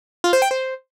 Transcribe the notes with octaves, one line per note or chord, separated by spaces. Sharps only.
F4
C5
G5
C5